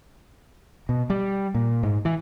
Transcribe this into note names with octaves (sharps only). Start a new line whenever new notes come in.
B2
G3
A#2
G#2
E3